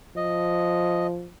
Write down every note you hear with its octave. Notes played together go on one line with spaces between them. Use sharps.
F3 D#5